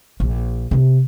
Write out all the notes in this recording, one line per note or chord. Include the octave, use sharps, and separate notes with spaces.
A#1
C3